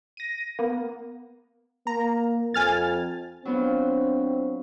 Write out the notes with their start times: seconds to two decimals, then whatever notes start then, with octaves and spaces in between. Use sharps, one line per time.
0.17 A#6 D#7
0.59 A#3 B3
1.87 A#3 A#5
2.54 F2 G#5 F6 A6
3.45 F#3 B3 C4 D4 F4